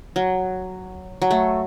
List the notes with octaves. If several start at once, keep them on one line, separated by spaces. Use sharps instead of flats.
F#3
F#3
A3